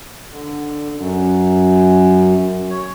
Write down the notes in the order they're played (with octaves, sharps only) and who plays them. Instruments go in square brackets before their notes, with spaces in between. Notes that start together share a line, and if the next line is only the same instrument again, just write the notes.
[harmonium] D3
F#2
C#5